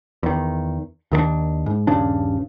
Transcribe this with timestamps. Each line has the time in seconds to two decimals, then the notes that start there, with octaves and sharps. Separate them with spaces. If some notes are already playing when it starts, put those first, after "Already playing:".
0.23 E2 D#3
1.12 D#2 D#3 A3 D4
1.66 G#2
1.87 D#1 G2 C#3 D4